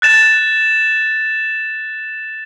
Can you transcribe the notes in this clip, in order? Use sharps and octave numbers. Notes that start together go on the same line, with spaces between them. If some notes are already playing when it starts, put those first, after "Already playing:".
F#6 A6 E7